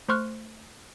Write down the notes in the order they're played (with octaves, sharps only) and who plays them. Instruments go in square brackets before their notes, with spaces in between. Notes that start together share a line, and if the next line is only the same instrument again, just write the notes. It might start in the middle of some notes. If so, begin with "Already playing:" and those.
[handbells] A3 C5 C6 C#6 F6 F#6